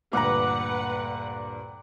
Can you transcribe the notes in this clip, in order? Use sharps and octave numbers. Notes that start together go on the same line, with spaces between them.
D2 G2 A#2 B4 F#5 A#5 D6